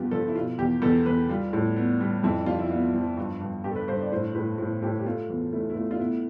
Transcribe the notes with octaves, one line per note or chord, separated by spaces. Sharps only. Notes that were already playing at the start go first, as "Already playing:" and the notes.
Already playing: G2 F3 B3 F4 G4
F3 A4
E4
B2 F4
E2 G4
E2 A4
E2 B4
G3 F4
A2
B3
G3
F2 E4
F3 F4
E4
B3 F4
F3
G2
G2
G2 G4
A4
B4
G2 C5
D5
A2 C5
A2 B4
A2
A2 G4
G4
A3 F4
E2
A3 E4
E4
A3 F4
F4
B3 E4